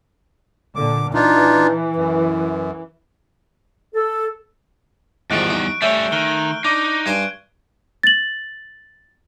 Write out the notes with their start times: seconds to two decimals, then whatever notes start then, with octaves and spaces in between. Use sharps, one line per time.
0.76 A#2 D3 D6
1.14 E3 D4 D#4 F4
1.96 F#2
3.94 A4
5.31 E2 G#2 D#3 F3 G3 C#6 F#6 D7
5.50 D#4
5.82 G3 A3 C#4 C#5 G6
6.12 D#3 F6 F#6 G7
6.65 D4 D#4
7.06 G2 C5 G#5 G#6 D7
8.03 A6 F#7